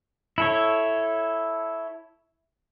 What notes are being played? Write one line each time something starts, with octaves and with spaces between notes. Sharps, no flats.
E4 A4 C#5